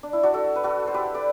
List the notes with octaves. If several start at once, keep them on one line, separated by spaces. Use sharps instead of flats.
D4
E4
D4 F#4
F#4 A4
B4
F#4 A4
C5
G4 B4
B4 D5